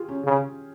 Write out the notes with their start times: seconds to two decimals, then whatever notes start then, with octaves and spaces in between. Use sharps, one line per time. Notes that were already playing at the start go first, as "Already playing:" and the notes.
Already playing: F4 G4 G#4
0.08 C#4
0.25 C#3